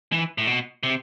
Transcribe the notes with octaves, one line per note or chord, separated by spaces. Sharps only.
E3
A2
B2
C3